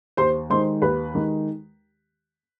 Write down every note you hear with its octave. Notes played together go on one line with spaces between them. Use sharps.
D#2 C5 C6
D#3 G#3 C5 C6
D#2 B4 B5
D#3 G#3